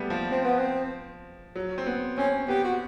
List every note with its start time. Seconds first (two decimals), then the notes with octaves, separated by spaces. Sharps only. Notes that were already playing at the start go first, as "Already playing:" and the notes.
Already playing: G3 A3 B3
0.10 F3
0.31 C4
0.45 B3
0.59 C4
1.56 F#3
1.78 C4
1.86 B3
2.18 C4 C#4
2.48 B3 G4
2.64 F#4